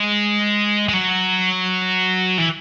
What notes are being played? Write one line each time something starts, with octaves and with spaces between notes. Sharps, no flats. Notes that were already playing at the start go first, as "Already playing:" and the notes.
Already playing: G#3
G#3
F#3
E3